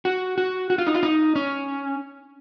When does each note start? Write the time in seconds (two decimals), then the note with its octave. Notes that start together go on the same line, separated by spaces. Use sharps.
0.05 F#4
0.38 F#4
0.70 F#4
0.78 F4
0.87 D#4
0.94 F4
1.03 D#4
1.36 C#4